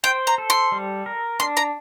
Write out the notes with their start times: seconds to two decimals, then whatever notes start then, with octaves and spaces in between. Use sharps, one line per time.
0.04 C5 G5
0.27 A#5
0.38 A4
0.50 C6
0.72 G3
1.06 A#4
1.40 D4 C6
1.57 A#5